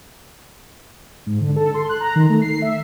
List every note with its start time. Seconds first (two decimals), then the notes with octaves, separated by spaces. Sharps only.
1.26 G#2
1.41 D3
1.56 A4
1.74 C6
1.89 F#6
2.00 A#5
2.15 D#3
2.29 A3
2.41 C7
2.62 E5